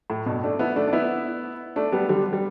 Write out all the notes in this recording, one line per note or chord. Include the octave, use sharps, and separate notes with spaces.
A2
G2 B2
A3 D4
B3 E4
A3 D4
D4
B3 E4
A3 D4
G3 B3
D3 G3
G3